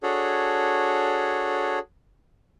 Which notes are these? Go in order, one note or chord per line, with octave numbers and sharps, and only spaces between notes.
D4 F#4 G#4 A4 C#5